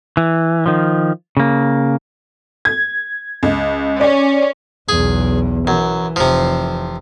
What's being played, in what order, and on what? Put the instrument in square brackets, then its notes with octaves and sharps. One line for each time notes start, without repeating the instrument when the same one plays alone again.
[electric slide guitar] E3
D#3 F3
C#3 A#3
[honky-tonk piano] G#6
C#2
[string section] C#4 [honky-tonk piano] D5
[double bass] B1 E2 [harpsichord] G#4
[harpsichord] F#2 [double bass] E3
[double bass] F1 E3 [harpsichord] C3 F3